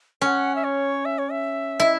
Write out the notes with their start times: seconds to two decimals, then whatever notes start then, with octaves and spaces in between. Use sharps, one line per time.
0.21 C#4 G#5
0.25 F#5
0.55 E5
0.64 C#5
1.05 E5
1.18 C#5
1.31 E5
1.80 E4